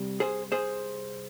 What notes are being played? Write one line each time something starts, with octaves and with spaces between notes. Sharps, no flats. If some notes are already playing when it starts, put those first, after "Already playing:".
Already playing: C3 G3
G#4 C5
G#4 C5